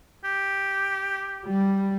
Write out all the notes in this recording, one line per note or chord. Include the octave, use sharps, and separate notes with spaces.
G4
G3